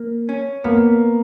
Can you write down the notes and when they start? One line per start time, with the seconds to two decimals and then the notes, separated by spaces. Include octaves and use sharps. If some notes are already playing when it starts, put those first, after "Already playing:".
Already playing: A#3
0.29 C#4
0.64 A#3 B3